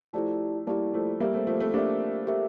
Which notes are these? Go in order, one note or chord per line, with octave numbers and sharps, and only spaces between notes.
F3 A3 E4 G4 D5 A5
G3 A#3 E4 G4 D5 A5
F3 A3
G3 A#3 G4 A#4 E5
A3 C4
F3 A3
A3 C4
A#3 D4 G4 A#4 E5
G4 A#4 E5